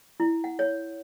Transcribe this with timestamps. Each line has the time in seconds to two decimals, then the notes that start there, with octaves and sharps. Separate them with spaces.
0.20 E4
0.44 F#5
0.59 C#5